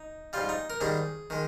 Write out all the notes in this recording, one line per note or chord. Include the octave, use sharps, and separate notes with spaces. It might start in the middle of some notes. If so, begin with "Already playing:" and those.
Already playing: D#4
G#2 G3 F4
D#4
A#4
G#2 D#3 G3 G#4
D#3 G#3